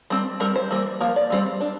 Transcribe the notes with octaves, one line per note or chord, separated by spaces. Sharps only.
G3 C4
G3 C4 A#4
C5
E3 G3 A#3
F3 A#3
D5
E3 G3 C4
D4